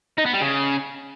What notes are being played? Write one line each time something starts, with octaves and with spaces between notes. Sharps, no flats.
D#4
B3
G3
C#3